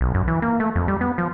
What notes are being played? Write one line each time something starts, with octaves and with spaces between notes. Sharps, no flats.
B1
F#2
E3
A#3
A3
F2
G3
B3
F3